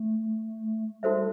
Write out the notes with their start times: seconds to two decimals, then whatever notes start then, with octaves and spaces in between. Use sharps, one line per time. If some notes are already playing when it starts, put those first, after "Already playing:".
Already playing: A3
1.03 G3 D#4 F#4 A4 C5 E5